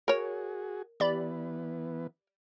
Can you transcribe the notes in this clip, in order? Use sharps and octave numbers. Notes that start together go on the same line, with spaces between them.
F#4 G#4 A#4 C#5
E3 B3 G4 D5 B5